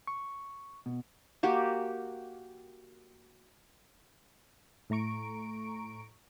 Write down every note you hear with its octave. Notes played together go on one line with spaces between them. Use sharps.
C#6
B2
A#3 F#4 G4
A2 A3 A#5 C#6 D7